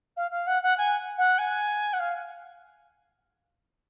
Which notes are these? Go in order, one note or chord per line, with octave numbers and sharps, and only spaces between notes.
F5
F5
F#5
F#5
G#5
F#5
G#5
F#5
F5